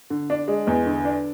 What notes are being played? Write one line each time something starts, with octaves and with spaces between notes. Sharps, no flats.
D3
D4
G#3
E2
D3
D4